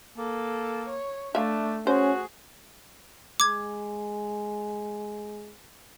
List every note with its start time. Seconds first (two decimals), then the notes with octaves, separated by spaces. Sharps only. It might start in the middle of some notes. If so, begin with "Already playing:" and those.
0.17 A#3 A4
0.89 C#5
1.35 A3 D4 E5 F5
1.87 C#4 F#4 G#4 C5
3.40 G#3 D6 G#6